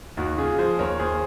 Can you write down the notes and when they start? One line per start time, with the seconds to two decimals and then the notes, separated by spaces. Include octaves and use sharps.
0.17 D#2 D#4 F#4
0.38 C#3 F4 G#4
0.58 F3 G#4 C5
0.79 D#2 A#4 C#5
1.00 D#2 G#4 C5